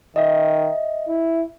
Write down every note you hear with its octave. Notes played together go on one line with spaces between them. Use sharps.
D#3 D#5 E5
E4